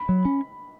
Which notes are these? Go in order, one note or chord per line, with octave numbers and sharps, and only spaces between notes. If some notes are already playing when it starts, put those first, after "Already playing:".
Already playing: B5
F#3
C#4